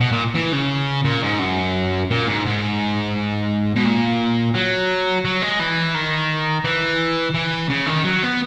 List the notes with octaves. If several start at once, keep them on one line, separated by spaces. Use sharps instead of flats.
B2
A#2
E3
C#3
A#2
G#2
F#2
A#2
G#2
G#2
B2
A#2
F#3
F#3
G#3
E3
D#3
E3
E3
C#3
D#3
F#3
B3